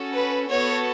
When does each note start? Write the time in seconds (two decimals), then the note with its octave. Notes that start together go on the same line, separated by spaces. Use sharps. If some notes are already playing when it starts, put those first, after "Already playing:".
Already playing: C#4 F#4 A4
0.14 B4
0.49 B3 F#4 A4 C#5